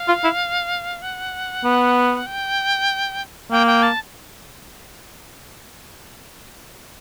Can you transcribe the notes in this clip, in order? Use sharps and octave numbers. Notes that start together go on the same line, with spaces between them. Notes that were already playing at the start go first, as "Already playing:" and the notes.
Already playing: F5
F4
E4
F#5
B3
G5
A#3 G5
G5
A5